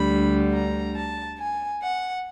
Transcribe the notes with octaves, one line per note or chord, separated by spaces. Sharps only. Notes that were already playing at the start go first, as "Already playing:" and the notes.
Already playing: D2 D3 G3 B5
A#5
A5
G#5
F#5